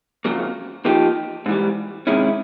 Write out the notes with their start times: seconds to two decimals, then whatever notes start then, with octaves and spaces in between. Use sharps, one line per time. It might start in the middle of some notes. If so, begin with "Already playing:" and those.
0.25 F2 C#3 F#3 A#3
0.85 F3 A#3 D#4 G4
1.46 G#2 E3 G3
2.07 C3 D#3 G#3 C#4 E4